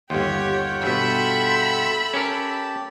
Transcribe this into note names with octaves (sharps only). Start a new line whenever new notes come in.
G1 D#2 F4 G4 C#5 F#5 G5
G2 B2 A4 E5 B5
C#4 G4 A#4 A5